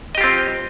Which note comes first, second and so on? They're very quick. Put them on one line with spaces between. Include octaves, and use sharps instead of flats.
D#5 G4 F4 C4